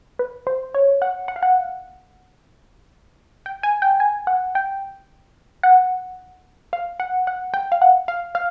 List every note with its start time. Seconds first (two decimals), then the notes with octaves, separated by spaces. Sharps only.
0.19 B4
0.47 C5
0.74 C#5
1.02 F#5
1.28 F#5
1.36 F5
1.43 F#5
3.46 G5
3.63 G#5
3.82 G5
4.00 G#5
4.27 F#5
4.55 G5
5.63 F#5
6.73 F5
7.00 F#5
7.27 F#5
7.54 G5
7.72 F5
7.82 F#5
8.08 F5
8.35 F5